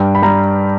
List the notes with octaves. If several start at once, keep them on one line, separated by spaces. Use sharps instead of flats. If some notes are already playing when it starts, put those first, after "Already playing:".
Already playing: G2 G3 G5
B5
G3 A#5